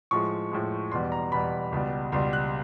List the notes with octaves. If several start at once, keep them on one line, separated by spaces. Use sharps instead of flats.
A2 F3 G#3 C#6
A2 F3 G#3
E2 B2 G3 C6
A#5
E2 B2 G3 B5
C#2 B2 G3
C#2 B2 G3 C6
F#6